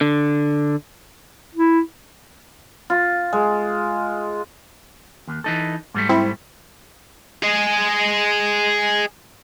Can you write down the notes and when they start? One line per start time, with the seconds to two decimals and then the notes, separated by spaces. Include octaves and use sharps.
0.01 D3
1.55 E4
2.90 F4
3.33 G#3
5.27 D#2
5.44 E3 D#4 A4
5.94 G#2 G3 A3
6.09 C4 E4
7.43 G#4 D#5